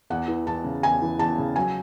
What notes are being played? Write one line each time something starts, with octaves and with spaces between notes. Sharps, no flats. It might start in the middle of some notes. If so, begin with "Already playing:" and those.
E2 F#5
E3
E2 A5
C#3
E2 G#5
E3
E2 A5
C#3
F#3 G#5